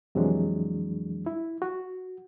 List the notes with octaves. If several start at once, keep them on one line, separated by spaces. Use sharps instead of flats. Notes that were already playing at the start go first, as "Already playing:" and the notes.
F2 C3 E3 F#3 G#3 D4
E4
F#4